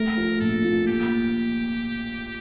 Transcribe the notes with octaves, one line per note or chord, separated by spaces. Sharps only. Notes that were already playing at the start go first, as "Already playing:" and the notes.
Already playing: A3 A#4
F3
A#1 A4
A#2
F3 G4